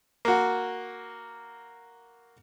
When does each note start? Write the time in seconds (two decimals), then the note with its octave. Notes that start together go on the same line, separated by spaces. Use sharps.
0.25 A#3 F#4